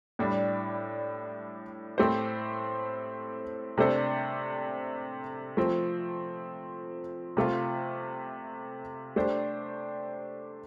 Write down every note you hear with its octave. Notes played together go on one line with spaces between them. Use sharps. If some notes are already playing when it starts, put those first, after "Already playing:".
A2 G3 D4
A2 A3 C4 G4 C5
C3 A3 D4 A4 C5
F3 A3 C4
C3 A3 F4
A3 D4 G4 C5